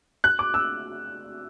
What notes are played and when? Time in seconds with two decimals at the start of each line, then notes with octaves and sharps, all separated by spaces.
0.24 F#6
0.39 D6
0.54 E6